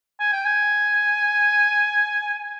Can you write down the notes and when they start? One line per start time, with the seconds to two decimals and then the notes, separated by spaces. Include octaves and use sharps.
0.20 G#5
0.32 G5
0.45 G#5